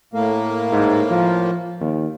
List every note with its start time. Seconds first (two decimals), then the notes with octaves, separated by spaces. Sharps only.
0.14 A2 A3 A#3
0.72 G#2
1.11 F3
1.80 D#2